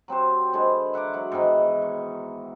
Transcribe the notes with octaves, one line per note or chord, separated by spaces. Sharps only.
F#3 C4 G4 C5
D3 G#3 B4 C5
E5 F#5 A#5 D6
F#3 F#4
G#2 B2 D#3 E3
C#6